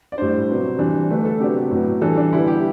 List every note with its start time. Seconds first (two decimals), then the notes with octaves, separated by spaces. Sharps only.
0.12 D5
0.18 A2 G3 D4 C5
0.49 C3 F#3 B3
0.79 E3 G3 D4
1.10 D3 A3 D4 B4
1.20 B4
1.25 A4
1.40 C3 F#3 B3 D4 G4
1.71 A2 F#3 B3
2.01 E3 G3 D4 A4
2.17 D4
2.32 D3 G3 B3 E4
2.47 G4